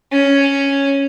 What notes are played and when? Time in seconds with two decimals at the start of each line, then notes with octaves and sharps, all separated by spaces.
0.12 C#4